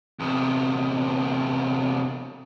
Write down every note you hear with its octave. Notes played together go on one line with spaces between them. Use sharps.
E2 C3